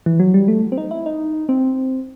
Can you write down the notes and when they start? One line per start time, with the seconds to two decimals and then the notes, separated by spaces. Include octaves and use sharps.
0.06 E3
0.19 F#3
0.34 G3
0.48 A3
0.72 C4
0.78 D#4
0.91 E4
1.06 D#4
1.49 C4